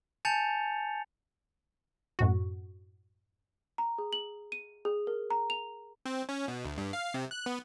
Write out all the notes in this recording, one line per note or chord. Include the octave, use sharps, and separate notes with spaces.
G#5 A5 G6 A6 C#7 F7
F#2 A2 F#4
A#5
G#4
F#7
D#7
G#4
A#4
A#5
F7
C4
C#4
B2
D2
G2
F5
C3
F#6
B3